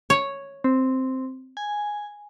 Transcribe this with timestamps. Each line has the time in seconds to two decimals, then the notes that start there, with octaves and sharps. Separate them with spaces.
0.10 C#5
0.64 C4
1.57 G#5